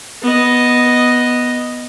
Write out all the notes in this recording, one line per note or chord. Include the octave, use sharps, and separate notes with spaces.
B3 D#5